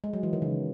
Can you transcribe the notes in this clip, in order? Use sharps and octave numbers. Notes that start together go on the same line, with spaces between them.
G#3
F#3
E3
D#3
C#3